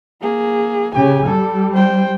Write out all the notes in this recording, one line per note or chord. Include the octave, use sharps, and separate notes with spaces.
A#3 G#4
C#3 G4 G#5
G3 A4
C5 G5